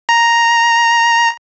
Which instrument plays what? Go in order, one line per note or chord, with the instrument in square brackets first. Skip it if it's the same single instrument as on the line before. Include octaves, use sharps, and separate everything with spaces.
[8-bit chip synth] A#5